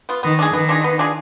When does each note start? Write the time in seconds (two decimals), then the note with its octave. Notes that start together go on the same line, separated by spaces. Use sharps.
0.09 B3 F4
0.23 D#3 B3
0.39 D4 F4 G#4
0.53 D#3 B3
0.69 D4 F4 G#4
0.84 B3
0.99 D4 F4 G#4